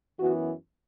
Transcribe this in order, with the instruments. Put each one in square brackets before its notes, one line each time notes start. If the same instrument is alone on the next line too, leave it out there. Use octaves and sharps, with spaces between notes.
[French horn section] F#2 E3 B3 F#4